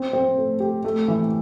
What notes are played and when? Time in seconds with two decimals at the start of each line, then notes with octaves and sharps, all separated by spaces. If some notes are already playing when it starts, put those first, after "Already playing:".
Already playing: C4
0.13 C4
0.38 A3
0.60 G4
0.84 A3
1.08 E3